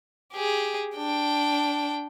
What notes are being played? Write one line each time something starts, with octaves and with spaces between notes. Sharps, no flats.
G4 G#4
D4 G5